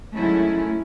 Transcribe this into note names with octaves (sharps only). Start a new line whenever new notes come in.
D#3 F#3 G#3 A3 C#4 E4